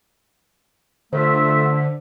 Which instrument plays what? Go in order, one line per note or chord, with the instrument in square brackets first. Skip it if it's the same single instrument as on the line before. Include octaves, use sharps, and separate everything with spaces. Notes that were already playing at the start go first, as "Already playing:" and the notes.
[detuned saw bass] D3 [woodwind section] A3 F4 E5 [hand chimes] C5